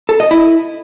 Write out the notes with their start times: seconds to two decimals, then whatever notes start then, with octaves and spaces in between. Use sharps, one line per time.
0.09 A4
0.20 D#5
0.31 E4